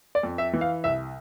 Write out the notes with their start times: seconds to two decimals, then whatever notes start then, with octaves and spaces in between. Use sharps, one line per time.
0.15 D5
0.23 F2
0.38 E5
0.53 E3
0.61 F5
0.84 C2 E5